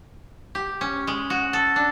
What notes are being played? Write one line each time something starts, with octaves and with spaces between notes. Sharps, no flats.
G4
C#4
G#3
F#4
A4
D4